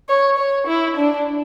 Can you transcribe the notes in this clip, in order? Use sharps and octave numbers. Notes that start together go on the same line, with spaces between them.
C#5
C#5
E4
D4